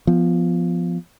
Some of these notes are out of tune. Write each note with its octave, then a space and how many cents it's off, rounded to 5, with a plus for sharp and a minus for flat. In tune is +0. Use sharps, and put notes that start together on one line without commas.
F3 -5 B3 +10